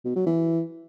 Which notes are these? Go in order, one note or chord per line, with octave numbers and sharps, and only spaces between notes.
B2
F#3
E3